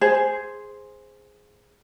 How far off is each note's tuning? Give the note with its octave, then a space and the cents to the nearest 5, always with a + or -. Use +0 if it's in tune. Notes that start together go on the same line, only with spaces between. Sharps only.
G#4 +0 C5 +0